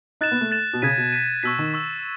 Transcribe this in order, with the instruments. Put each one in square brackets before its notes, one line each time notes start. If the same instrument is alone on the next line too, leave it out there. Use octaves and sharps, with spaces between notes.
[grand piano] D#4 [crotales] F#6 A6 E7
[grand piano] B3
A3
[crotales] F#6 A6 E7
[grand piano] B2
[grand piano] C#3 [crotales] G#6 B6 D#7
[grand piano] B2
[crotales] G#6 B6 D#7
[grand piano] B2 [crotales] C#6 E6 B6
[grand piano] D#3
[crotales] C#6 E6 B6